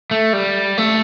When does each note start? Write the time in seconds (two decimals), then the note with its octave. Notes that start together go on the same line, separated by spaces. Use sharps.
0.11 A3
0.33 G3
0.78 A3